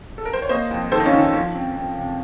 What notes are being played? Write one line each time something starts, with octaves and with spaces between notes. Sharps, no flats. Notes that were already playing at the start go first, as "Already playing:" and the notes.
A4
A#4
C5
C#5
A#3 C5 D#5
F2
D#3 A4 C5
D#4
C#4 F4
D#3
F3
C4
C4
C3